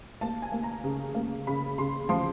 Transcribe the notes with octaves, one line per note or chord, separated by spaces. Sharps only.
A#3 A5
G#5
A#3
A#5
C#3
A#3
C#3 B5
C#3 C6
F3 C6